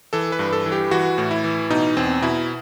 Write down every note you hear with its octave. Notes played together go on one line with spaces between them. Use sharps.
E3 A4
B4
G2
A4
E3
G4
E3 F#4
A2
E4
E3
B2 D#4
E2 C4
B2 E4